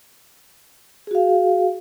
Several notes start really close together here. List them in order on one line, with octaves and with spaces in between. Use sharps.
G#4 F#4 F5